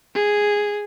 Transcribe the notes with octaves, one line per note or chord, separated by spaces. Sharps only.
G#4